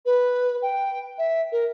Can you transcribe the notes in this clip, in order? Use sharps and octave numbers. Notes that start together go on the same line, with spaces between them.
B4
G5
E5
A#4